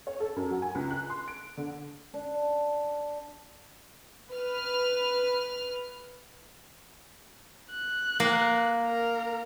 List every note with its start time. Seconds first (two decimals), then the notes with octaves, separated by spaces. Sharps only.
0.07 C#5
0.20 A4
0.36 F#2
0.51 F#3
0.62 G#5
0.75 C#2
0.91 F#6
1.10 C6
1.28 D7
1.57 D3
2.14 D4
4.32 B4 F6
7.71 F#6
8.20 A#3
8.85 A#4 A#5